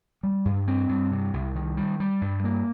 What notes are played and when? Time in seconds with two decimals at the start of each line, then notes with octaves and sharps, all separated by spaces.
0.23 G3
0.45 G2
0.68 C4
0.89 G2
1.11 C3
1.34 C2
1.55 D#3
1.77 G3
2.00 G3
2.21 G2
2.44 A#3